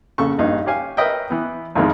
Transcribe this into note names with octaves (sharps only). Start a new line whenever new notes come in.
A#1 C#3 A4 C#6
A#1 G2 D#4
G4 C#5 F5 G#5
A#4 B4 C#5 D#5 E5 G5
E3 B3
A1 F2 D#3 G#3